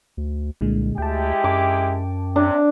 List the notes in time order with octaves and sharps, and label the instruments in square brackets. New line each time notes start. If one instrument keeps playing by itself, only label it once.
[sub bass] D2
[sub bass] C2 [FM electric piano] A#2 D3 G#3
[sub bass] D2 [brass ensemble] G#3 E4 G4 [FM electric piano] G5 A5
[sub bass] F#2 [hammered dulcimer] D6
[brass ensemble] C3 [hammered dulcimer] D4